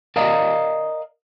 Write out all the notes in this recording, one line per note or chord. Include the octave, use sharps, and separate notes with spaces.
A#4 D5 D#5 F5 A#5